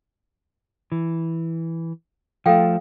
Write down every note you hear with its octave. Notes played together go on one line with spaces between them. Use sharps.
E3
F3 A3 A4 F5 G5